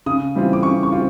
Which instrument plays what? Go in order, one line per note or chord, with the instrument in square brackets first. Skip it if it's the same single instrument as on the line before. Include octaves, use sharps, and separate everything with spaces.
[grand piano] C#3 D#6
E3 G3 C4 F4
D6
C#3 C#6
C#6
C4 F4